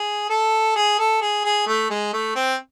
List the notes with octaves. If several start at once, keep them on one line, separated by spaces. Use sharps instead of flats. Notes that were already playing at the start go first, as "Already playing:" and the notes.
Already playing: G#4
A4
G#4
A4
G#4
G#4
A3
G#3
A3
C4